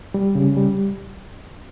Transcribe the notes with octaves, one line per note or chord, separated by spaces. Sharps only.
G3
C#3
G3